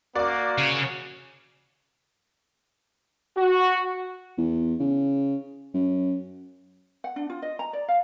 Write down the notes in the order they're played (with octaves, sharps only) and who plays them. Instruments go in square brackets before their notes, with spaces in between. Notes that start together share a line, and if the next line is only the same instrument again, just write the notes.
[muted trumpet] A#3 [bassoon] F#4 [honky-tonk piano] D5 D6
[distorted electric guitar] C#3
[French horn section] F#4
[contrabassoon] E2
C#3
F#2
[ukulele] F#5
D4
F4
D#5
A#5
D5
F5